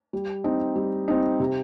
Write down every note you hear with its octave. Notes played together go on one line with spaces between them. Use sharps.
G3
C4 D#4
G3
C4 D#4
C3